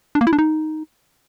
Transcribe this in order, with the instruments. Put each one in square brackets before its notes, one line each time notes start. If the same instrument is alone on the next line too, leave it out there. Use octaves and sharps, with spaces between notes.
[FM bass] D4
A#3
E4
D4
D#4